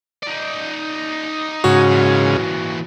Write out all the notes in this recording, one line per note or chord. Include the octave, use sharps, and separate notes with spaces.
D#4 D5
G#2 C#3 F#4
A#2 E3